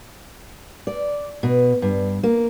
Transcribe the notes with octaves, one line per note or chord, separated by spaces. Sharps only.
D5
B2
G2
A#3